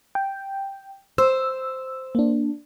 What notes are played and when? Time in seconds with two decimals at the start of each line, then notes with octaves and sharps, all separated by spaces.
0.15 G5
1.18 C5 E6
2.15 A#3 D4